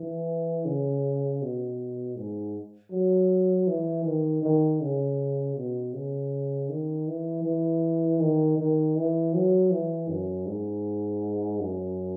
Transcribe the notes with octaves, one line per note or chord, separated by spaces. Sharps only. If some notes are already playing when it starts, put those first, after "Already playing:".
Already playing: E3
C#3
B2
G#2
F#3
E3
D#3
D#3
C#3
B2
C#3
D#3
E3
E3
D#3
D#3
E3
F#3
E3
F#2
G#2
F#2